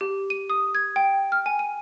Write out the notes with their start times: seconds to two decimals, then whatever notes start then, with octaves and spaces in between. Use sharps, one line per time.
0.01 G4
0.30 D#7
0.50 D#6
0.75 G#6
0.96 G5
1.32 F6
1.46 G#5
1.59 D#7